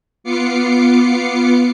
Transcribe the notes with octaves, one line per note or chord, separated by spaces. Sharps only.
B3 F4 D6 C7 C#7